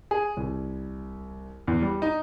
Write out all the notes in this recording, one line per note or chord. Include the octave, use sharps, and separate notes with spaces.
G#4
C2
E2
G3
D#4